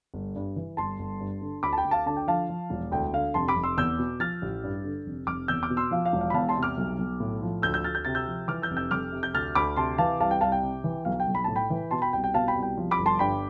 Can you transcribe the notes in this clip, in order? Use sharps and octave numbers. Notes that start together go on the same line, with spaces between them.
G1
G2
E3
G1 A5 C6
G1
G2
D3
D2 B5 D6
A5
G5 B5
D2
F5 A5
D3 A5
G5
F3 F5 A5
F3
E1
D2 G5
D3 F5
F1 A5 C6
B5 D6
F1
C6 E6
E2 E6 G6
B2
F3 F6 A6
A1
G2
D3
F1
F1 D6 F6
E2 E6 G6
D6 F6
B2
C6 E6
F3 F5
F5
E1
F5
B5
E2 F5 A5
A5 C6
C3
D6 F6
B1
B1
A2
F3
D2 E6 G6
E6 G6
D2 F6 A6
G6
C3 A6
E6 G6
F3
E3 D6 F6
E6 G6
F1
E6 G6
F2 D6 F6
C3
G6
D2 F6 A6
D2 B5 D6
C3 A5 C6
E3 F5 A5
C2 F5 A5
G5
C2 F5 A5
G5
C3
E3
B1 F5
G5
B1
B5
A2 A5
G5 B5
E3
B2 A5 C6
G5 B5
C2 G5
G5
B2 F5 A5
G5 B5
C2
G5
F3
B5 D6
G1
A5 C6
G2 G5 B5